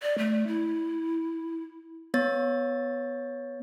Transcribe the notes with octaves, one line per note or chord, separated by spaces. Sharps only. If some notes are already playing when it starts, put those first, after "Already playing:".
D5
A3
E4
B3 C#5 A6